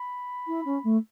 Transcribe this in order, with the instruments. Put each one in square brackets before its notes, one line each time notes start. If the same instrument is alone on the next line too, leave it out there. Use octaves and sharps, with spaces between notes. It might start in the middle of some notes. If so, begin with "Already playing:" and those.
Already playing: [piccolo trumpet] B5
[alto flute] E4
C#4
A3